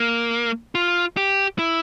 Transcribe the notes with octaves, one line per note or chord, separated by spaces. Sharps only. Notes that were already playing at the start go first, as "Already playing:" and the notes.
Already playing: A#3
F4
G4
E4